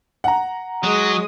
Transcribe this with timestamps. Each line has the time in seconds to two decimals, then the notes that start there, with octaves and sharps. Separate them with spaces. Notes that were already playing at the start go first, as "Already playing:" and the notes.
0.24 F#5 A#5
0.83 F#3 G#3 D#6